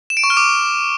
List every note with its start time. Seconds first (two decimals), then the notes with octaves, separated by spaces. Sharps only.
0.10 E7
0.17 D7
0.24 C#6
0.30 F6
0.37 D6